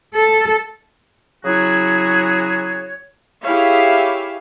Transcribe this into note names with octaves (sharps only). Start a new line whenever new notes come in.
A4
C#3 F#3 E4 F#4 G#4 C#5
E4 G4 G#4 C#5 E5 F5